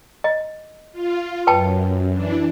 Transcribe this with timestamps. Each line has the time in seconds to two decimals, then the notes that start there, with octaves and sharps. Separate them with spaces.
0.24 D#5
0.92 F4
1.47 F#2 B4 G5 A5
2.13 E3 D4